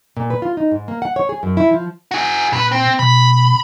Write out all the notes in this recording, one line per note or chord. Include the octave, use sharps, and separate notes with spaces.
A#2
B4
F4
D#4
G#2
A#3
F#5
C#5
G#4
F#2
E4
F3
F#4 G#4
G2 A#2 B4
C4
B2 B5